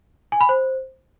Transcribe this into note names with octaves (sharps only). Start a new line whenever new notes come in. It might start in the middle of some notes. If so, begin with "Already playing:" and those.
G#5
B5
C5